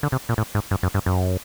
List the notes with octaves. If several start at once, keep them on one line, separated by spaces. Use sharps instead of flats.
D3
C3
A#2
A2
G#2
G2
F#2
G2
F#2